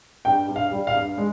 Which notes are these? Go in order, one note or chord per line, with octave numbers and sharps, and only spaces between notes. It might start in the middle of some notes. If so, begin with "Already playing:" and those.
G2 G5
G2
F5
G3
F5
G2
G#3